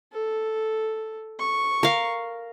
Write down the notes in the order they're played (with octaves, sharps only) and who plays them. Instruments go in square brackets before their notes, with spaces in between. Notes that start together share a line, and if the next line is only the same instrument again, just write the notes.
[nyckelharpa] A4
C#6
[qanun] A#4 F5